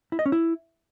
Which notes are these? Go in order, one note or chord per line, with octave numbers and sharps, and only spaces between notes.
E4
D#5
C#4
E4